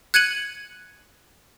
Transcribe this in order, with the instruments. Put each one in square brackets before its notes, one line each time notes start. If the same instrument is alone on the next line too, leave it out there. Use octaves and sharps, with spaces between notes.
[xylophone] F#6 G#6 C#7 D#7 F#7